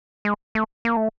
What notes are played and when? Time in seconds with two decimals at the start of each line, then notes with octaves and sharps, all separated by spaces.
0.25 G#3
0.55 A3
0.85 A#3
0.97 A3